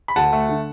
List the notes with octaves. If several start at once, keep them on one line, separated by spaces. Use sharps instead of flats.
B5
D2 F#5 A5
A3
D3